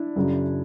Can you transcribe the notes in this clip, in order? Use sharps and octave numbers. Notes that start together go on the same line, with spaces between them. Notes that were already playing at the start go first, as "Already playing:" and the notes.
Already playing: D4 E4
F#2 C#3 F#3